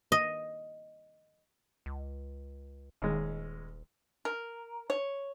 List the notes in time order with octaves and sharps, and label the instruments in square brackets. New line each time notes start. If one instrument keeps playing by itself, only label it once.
[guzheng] D#5
[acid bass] C#2
[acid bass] D#1 [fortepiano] D#2 G#3
[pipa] A#4
C#5